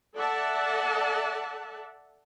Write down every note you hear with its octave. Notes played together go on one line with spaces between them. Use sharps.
A4 D5 E5 F#5 A5